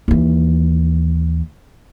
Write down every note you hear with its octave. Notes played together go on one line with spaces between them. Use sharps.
D#2 E3